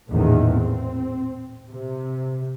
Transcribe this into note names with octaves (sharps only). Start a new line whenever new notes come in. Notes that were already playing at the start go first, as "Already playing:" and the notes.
A1 E2 A#2 D#3
C4
C3